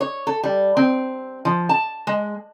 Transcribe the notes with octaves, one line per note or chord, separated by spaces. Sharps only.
C#5
A4
G3
C4
F3
A5
G#3